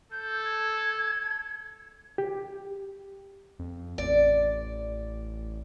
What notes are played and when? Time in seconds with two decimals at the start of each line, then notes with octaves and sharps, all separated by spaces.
0.12 A4 G6
0.45 G#6
2.18 G4
3.59 F2
3.98 A1 D5